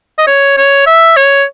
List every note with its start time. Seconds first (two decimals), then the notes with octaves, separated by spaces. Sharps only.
0.18 D#5
0.27 C#5
0.58 C#5
0.87 E5
1.17 C#5